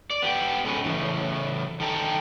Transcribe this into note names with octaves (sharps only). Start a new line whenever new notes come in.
D5
B3 G4
B2 G#3 C#4 G#4 A4 B4
A2 C#3 E3
D#3 A4 G5 A#5